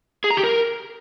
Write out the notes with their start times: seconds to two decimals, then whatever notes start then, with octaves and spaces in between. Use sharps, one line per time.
0.24 G#4
0.31 A#5
0.37 G4
0.44 A#4